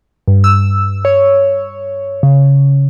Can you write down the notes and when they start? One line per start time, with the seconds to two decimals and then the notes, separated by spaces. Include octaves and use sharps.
0.28 G2
0.44 E6
1.05 C#5
2.23 C#3